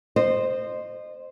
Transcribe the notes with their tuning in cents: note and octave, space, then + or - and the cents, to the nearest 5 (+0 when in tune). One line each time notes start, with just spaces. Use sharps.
C5 +0 D#5 -25